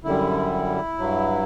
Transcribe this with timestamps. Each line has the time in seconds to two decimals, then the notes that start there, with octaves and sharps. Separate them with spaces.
0.03 F#2 D3 G3 E4
0.99 G2 F#3